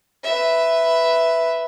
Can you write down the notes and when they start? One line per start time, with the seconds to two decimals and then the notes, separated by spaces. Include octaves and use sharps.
0.24 B4 E5